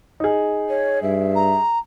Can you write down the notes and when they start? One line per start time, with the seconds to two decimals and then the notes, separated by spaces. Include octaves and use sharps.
0.20 D#4 G#4
0.69 C#5
1.03 G2 E5
1.35 A#5